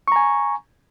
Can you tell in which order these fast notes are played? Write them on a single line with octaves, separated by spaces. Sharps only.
C#6 A#5 G#5